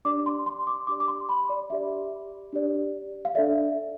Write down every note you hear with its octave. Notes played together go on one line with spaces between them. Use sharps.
D4 G4 D5 D6
C6
C6
D6
D4 G4 D5 D6
D6
C6
B5
D5
D4 G4 D5 E5
D4 G4 D5
F5
D4 A4 D5 E5